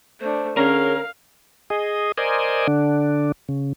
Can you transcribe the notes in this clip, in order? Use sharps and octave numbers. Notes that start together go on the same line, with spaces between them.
A3 D4 C5
D3 C#4 G#4 A#4 F5
G#4 D#5
A#4 C5 D5 D#5 G#5
D3 D4
C#3